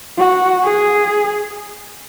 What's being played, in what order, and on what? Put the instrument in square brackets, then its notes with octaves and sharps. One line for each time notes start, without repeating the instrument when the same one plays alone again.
[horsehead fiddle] F#4
G#4